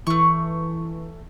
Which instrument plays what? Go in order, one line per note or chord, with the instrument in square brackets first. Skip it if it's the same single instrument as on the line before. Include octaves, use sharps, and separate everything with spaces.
[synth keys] E3 [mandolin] A3 C#6